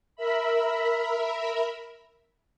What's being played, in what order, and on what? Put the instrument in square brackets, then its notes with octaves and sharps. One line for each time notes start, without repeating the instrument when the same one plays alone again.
[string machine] A#4 E5 B5